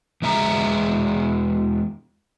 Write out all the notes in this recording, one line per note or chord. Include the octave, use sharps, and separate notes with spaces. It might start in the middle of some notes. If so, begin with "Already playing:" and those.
E2 G#3 E5 A#5